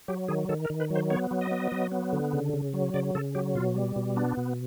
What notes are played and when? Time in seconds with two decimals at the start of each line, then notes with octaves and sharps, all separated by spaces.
0.08 F#3 G4
0.28 D#3 G#4
0.49 D#3 A4
0.65 A#4
0.70 D#3
0.80 B4
0.90 F#3
0.95 C5
1.10 B3 C#5
1.31 F#3
1.41 D#5
1.51 B3
1.72 F#3
1.92 B3
2.13 D3
2.33 C#3
2.53 C#3
2.73 F#3
2.94 C#3 D5
3.15 C#3 A4
3.35 F#3 G4
3.55 B2 F4
3.76 G3
3.96 B2
4.17 B3 D4
4.37 B2